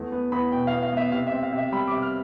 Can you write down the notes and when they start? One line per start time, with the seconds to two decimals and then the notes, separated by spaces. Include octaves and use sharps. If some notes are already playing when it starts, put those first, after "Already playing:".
Already playing: E2 A3
0.12 B3
0.32 E2 B5
0.52 B2 G5
0.67 F5
0.73 E2
0.82 F5
0.93 B3 E5
1.12 C3 F5
1.27 E5
1.32 C4
1.43 F5
1.53 C3
1.58 E5
1.72 G3 B5
1.88 D6
1.92 C3
2.02 F6